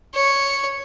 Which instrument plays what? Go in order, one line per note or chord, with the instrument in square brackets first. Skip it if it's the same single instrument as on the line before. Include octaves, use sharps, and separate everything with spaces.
[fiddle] C#5